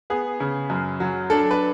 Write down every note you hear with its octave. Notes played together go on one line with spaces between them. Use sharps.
B3 G#4
C#3
F#2
F#3
D4 A4
B4